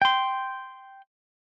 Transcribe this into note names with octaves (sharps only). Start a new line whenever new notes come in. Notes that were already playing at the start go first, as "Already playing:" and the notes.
G5 C6